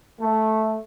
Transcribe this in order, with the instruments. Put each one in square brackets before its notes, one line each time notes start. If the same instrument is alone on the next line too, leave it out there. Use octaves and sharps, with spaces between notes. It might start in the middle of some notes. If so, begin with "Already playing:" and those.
[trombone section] A3